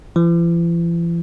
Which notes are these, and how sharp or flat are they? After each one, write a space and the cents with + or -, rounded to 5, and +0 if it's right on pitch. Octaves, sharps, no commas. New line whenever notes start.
E3 +45